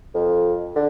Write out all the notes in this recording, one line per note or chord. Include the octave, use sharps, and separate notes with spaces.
F2
D3